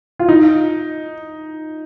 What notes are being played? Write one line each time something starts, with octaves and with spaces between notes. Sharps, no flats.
F4
D#4